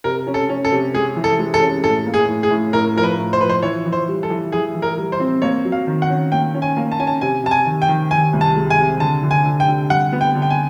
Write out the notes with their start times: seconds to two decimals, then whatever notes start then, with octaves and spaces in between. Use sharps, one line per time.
0.04 C3 A#4
0.27 C#4
0.34 A4
0.49 C#4
0.65 A4
0.72 C3
0.94 G#3 G#4
1.16 E3
1.24 A4
1.39 G#3
1.54 A4
1.61 C#4
1.84 A2 A4
2.06 A#3
2.14 G#4
2.28 A2
2.43 G#4
2.51 A2
2.73 A2 A#4
2.96 F3 A#4
3.03 B4
3.18 A2
3.33 C5
3.41 F3 B4
3.49 C5
3.62 E3 C#5
3.86 E3
3.93 C5
4.08 G3
4.23 A4
4.30 E3
4.52 E3 G#4
4.75 E3
4.82 A#4
4.97 G3
5.12 C5
5.20 C4
5.42 A#3 C#5
5.65 F#3
5.72 F5
5.87 D#3
6.02 F#5
6.10 C#4
6.32 A#3 G5
6.54 C#4
6.62 G#5
6.77 A#3
6.92 A5
6.99 C#4 G#5
7.07 A5
7.21 C3 G#5
7.44 C3 A5
7.51 G#5
7.66 D#3
7.82 G5
7.88 D#3
8.11 D#3 G#5
8.33 C2
8.41 A5
8.56 G#3
8.70 G#5
8.79 C3
9.00 D3 A5
9.23 D3
9.31 G#5
9.46 D3
9.60 G5
9.68 D3
9.90 G3 F#5
10.13 B3
10.21 G5
10.35 D3
10.42 G5
10.50 G#5